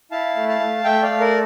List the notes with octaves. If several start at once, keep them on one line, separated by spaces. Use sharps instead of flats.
E4 F5 A5
A3
F5 A5
A3
A3 E5 G5
D5 F5
A3
A#4 D5